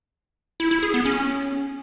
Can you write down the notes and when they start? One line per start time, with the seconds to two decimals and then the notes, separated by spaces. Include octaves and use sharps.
0.60 E4
0.71 E4
0.83 G#4
0.94 B3
1.05 C#4